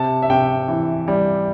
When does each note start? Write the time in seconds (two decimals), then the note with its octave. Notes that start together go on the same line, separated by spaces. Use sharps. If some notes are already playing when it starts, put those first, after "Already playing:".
Already playing: C3 A5
0.22 E5
0.30 C3 G5
0.68 E3
1.08 G3